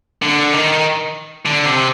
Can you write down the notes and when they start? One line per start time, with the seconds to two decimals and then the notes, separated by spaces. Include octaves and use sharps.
0.22 D3
0.53 D#3
1.45 D3
1.66 C3